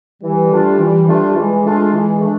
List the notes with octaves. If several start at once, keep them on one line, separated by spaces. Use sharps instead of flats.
E3 G3
A3 D4 F4
E3
A3 D4 F4
E3 G#3
A3 D4 F4
E3
A3 D4